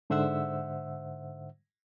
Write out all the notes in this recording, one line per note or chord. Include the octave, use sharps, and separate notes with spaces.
G#2 D3 C5 E5 F#5 E6